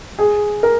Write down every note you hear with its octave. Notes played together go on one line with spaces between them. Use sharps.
G#4
A#4